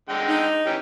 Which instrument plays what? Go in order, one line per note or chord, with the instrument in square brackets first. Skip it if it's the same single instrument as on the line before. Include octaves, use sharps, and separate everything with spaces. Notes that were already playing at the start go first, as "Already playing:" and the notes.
[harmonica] D3 G#3 G5
[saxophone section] D#4
[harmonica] E3 C#4 G4